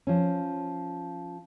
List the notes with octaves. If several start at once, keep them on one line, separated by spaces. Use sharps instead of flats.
F3 C#4